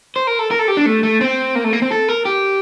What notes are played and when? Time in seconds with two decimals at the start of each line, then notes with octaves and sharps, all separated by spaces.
0.16 C5
0.27 A#4
0.39 A4
0.51 A#4
0.59 A4
0.68 G4
0.77 D4
0.86 A3
1.03 A3
1.21 C4
1.55 A#3
1.64 A3
1.73 A#3
1.82 C4
1.91 A4
2.08 A#4
2.25 G4